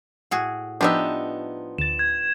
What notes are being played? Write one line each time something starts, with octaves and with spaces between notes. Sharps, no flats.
A2 F#4 G#4
F3 B3 D4 D#4 G4 E5
D2 A6 E7
G#6